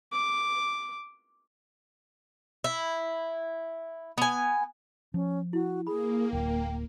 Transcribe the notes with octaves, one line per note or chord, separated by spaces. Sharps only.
D6
E4
B3 G#5
F3 C#4
E4 F#4
A#3 G#4 B5
D1 G5